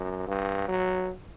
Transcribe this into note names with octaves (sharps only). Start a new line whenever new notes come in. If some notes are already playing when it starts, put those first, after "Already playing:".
Already playing: F#2
G2
F#3